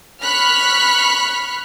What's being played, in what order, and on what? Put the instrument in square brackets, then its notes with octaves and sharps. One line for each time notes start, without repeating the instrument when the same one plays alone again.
[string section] B5 C#6 F6 F#6 B6